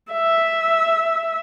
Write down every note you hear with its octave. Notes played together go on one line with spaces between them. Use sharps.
E5